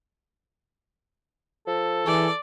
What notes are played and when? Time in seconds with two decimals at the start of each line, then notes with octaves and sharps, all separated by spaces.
1.67 F3 A4
2.06 E3 G#4 D5